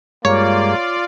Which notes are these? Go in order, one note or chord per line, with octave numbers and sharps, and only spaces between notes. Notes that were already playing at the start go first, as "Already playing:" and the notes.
G2 G#3 A#3 F4 C#5 D5